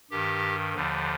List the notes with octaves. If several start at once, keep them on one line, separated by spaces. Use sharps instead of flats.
G2 D#3 G4
D#2 D3 F3